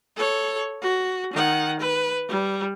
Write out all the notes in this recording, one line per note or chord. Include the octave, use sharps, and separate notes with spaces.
A4 C#5
F#4
D#3 F#5
B4
G3